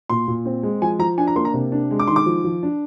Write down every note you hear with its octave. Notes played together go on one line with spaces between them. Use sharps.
A#2 C6
A#2
C4
G#3
F3 G#5
F3 A#5
D4 G#5
A#5
A#3 C6
A#5
C3
D4
G#3
D6
D#3 C6
D6
F3
F3
D4